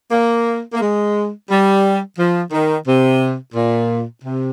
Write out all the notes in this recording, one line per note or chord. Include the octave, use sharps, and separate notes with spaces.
A#3
A#3
G#3
G3
F3
D#3
C3
A#2
C3